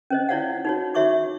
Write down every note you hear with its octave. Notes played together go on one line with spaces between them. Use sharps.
C#4 C5 D#5
E4 F4 C#5 D5 F5 F#5
D#4 F#4 C#5
F#4 C#5 E5 C#6 D6